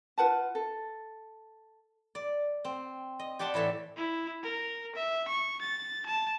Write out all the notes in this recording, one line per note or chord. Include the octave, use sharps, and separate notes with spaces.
F4 B4 F#5 A5
A4
D5
C4
D#5
G4 D5 F#5 A5 C6
A2 E3 A4 E5
E4
A#4
E5
C#6
A6
A5